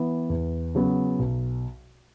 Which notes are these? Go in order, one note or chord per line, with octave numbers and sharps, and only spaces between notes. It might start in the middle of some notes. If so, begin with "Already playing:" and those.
Already playing: E3 B3
E2
C#3 F#3 B3
B1